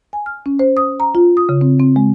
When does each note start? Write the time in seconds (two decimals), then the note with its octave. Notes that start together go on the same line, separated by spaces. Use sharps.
0.13 G#5
0.26 F6
0.46 C#4
0.59 C5
0.77 D#6
1.00 A#5
1.15 F4
1.37 D#6
1.49 C#3
1.61 C4
1.80 C4
1.96 G#3